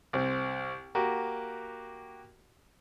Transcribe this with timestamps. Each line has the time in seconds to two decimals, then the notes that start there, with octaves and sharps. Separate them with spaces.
0.13 C2 C4
0.95 A#3 F#4 G4